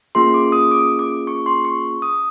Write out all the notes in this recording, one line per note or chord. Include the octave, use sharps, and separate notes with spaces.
A#3 C#4 F4 G#4 C6
D6
D#6
D6
D6
C#6
C6
C#6
D#6